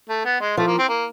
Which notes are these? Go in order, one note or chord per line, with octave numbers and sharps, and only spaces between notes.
A3
B3
G#3
F3 A3
A#3
C4
A#3